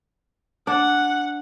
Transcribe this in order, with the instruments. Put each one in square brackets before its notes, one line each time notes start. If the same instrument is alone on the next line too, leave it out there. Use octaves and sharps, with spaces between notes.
[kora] D4 [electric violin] F#5